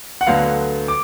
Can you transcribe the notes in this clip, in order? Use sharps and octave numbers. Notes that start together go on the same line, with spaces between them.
F#5
D2 D3 F#3 B3 F5
D6